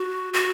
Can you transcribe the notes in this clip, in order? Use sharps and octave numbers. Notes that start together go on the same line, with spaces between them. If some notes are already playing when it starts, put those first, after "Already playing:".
Already playing: F#4
F#4